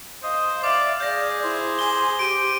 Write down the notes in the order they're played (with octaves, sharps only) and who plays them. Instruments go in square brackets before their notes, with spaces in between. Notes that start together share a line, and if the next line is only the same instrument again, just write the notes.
[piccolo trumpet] C5 [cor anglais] D#5 [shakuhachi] F5
[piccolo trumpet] D5 [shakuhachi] E5 [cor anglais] F5 [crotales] D6
[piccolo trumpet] G#4 [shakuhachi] D5 [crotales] G6 A#6
[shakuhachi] E4 [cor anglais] C5
[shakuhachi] G#5 [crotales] G7
[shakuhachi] G4 [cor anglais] C5 [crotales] D7 D#7